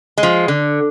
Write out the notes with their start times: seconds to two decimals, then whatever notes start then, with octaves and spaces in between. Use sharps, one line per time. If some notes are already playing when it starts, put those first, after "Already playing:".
0.18 G#3
0.23 F3
0.48 D3